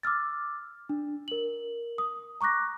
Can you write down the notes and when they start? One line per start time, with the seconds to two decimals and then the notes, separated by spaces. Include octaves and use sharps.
0.03 D6 E6 F6 A6
0.89 D4
1.28 A#4 F#7
1.98 D#6
2.41 A#5 C#6 D6 F#6 A#6